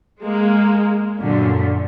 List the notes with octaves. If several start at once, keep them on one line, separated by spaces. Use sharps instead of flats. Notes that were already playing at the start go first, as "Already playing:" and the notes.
G#3 A#3
F#2 A#2 D3